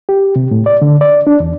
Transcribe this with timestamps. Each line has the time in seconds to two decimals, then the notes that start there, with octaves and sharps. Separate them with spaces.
0.09 G4
0.36 C3
0.51 A2
0.66 D5
0.82 D3
1.01 D5
1.27 D4
1.40 E2